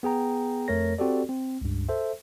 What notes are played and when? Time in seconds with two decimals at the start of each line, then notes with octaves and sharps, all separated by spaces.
0.03 B3 G#4 G5 A#5
0.68 F2 A3 A#4 C#5 A#6
0.99 C4 F#4 G4 A4 D5
1.29 C4
1.61 C#2 G2
1.89 A4 C5 E5